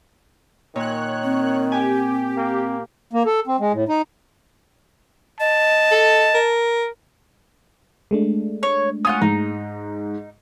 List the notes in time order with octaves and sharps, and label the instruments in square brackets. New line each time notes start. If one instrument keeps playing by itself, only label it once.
[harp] A#2 [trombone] D#3 [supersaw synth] C#5 F#6
[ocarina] C4
[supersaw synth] G4 [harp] G#5
[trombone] A#3
[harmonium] A#3
A4
C4
G#3
A2
D#4
[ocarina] D#5 [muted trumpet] A5
[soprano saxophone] A4
A#4
[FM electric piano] G#3 A3 D4
[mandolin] C#5
[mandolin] C#4 F4 F#5 [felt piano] D#6
[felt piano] G#2 [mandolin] D#4